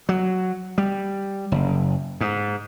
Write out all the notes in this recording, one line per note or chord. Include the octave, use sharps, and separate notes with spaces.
F#3
G3
F#1
G#2